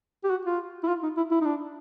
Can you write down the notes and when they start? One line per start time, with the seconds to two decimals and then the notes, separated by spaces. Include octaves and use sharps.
0.24 G4
0.30 F#4
0.45 F4
0.83 E4
0.88 F4
1.03 D#4
1.17 E4
1.31 E4
1.41 D#4
1.45 D4